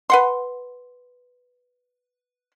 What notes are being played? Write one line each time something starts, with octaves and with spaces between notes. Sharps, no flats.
B4 F#5 C6